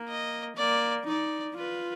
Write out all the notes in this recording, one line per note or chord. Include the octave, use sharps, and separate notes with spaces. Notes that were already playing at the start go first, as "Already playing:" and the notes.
Already playing: A#3
D#5
A#3 D5
D#4 D5
F4 B4